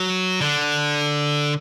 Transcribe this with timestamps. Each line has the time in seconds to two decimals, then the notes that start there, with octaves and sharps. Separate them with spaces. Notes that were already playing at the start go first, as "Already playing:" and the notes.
Already playing: F#3
0.41 D3